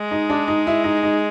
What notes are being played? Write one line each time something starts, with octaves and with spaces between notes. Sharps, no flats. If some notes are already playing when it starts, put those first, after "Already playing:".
Already playing: G#3
D#4
D4
D#4
E4
D#4
D#4